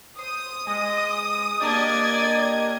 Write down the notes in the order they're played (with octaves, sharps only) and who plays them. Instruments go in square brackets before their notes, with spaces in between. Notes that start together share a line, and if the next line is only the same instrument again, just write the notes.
[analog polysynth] C5 [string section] D#6
[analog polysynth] G#3 [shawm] D#5
[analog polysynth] A#3 D4 G4 [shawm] D5 [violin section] D#5 G#6